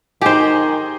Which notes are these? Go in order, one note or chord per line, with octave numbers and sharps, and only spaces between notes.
D#3 D#4 G4 G#4 C5